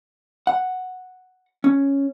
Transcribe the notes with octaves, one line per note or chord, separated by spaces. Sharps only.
F#5
C#4